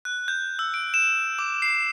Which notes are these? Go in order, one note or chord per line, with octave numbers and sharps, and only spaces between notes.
F#6
G6
E6
D7
E7
D6
C7